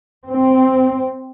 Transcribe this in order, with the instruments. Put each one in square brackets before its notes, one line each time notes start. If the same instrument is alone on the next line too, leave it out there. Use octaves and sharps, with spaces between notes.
[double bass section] C4